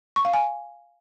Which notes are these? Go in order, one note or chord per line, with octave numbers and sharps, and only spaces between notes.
C#6
F5
G#5